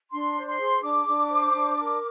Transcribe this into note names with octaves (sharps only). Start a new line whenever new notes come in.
D4 C6
C5
C6
G#4
D4 D6
D4
C5
D4
A#4